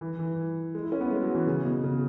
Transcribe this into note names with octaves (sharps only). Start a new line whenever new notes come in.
E3
E3
G#3
E4
C#4
B3
G#3
F#3
E3
C#3
B2
C#3